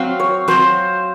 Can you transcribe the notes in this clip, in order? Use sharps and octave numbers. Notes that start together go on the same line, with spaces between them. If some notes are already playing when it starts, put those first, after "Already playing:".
Already playing: F#3 C4 F#4 F5
C#5
F#3 C4 F#4 C5